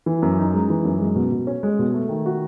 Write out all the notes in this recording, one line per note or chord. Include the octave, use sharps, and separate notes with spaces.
E3
F#2
D#4
G#3
E3
F#2
G#3
B2
B2
C#4
G#3
B2
A3
D#3
F#4